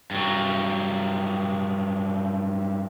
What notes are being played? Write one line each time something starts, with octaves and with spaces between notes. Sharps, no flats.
G2 F#3